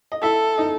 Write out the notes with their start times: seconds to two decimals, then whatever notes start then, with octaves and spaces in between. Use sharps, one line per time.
0.12 D#5
0.23 E4 A4 E5
0.58 D#4 D#5